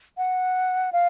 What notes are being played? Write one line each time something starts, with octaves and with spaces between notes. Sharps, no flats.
F#5
F5